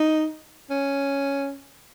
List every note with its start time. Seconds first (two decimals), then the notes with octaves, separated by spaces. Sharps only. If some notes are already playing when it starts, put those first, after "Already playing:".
Already playing: D#4
0.70 C#4